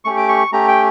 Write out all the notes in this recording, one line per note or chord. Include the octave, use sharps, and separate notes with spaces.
A3 C#4 G4 C#6
D6
C#6
A3 C#4 G4 A#5
G5